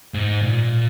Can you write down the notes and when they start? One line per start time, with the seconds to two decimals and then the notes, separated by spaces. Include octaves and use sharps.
0.14 G#2
0.42 A#2